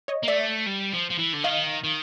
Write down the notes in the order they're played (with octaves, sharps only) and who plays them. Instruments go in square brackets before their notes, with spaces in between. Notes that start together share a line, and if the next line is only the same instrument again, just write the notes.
[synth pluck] C#5 D#5
[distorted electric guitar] A#3
[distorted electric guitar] A3 [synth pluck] D5 E5
[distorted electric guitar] G3
F3
F3
E3
D3
[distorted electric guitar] D#3 [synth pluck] D#5 F5
[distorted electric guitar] D#3